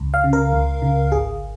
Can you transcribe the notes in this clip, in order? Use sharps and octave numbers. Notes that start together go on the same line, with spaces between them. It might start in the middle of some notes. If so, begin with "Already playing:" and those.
Already playing: C#2
F5
C#3
A#4
C#2
C#3
G#1 G#4